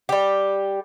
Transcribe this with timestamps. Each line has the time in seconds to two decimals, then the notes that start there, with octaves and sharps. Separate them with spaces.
0.09 G3 G4